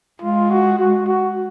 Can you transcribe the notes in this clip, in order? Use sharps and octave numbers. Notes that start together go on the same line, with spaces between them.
G#3 F4
F#4
F#4
F#4